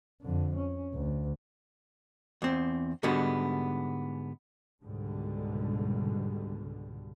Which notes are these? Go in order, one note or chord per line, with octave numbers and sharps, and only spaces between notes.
F2 D3
C#4
D2
E2 C4
G#2 D3 G3 G#3 B3 F#4
C#2 G#2 B2 D3 G3